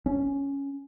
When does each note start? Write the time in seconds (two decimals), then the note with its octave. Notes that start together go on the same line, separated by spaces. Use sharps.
0.06 C#4